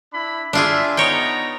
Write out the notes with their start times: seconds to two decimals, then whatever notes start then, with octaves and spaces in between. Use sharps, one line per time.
0.12 D4 E4 B5
0.53 D4 E4 F4 G#4 E5
0.97 B3 D#4 C#5 G5 A#5